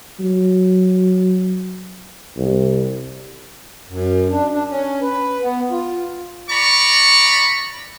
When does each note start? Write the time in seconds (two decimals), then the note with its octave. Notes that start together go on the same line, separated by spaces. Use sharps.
0.20 F#3
2.37 C2
3.89 F#2
4.30 D4
4.52 D4
4.70 C#4
5.01 B4
5.43 B3
5.71 F4
6.50 D5 A#5 B5 C#6